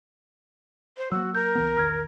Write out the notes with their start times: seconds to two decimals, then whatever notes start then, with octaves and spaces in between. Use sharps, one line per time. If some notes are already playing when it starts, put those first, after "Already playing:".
0.97 C5
1.12 F#3 A#3 F#4 E6
1.35 A#4 G6
1.55 C#2 E3 B3
1.77 A#1 E2 D#3 F6 G#6